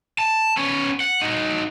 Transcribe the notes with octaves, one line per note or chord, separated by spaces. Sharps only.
A5
B3 C#4
F#5
D#4 F#4